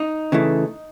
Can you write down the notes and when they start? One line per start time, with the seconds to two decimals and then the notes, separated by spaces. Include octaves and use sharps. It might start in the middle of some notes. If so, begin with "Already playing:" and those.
Already playing: D#4
0.32 C#3 E3 A3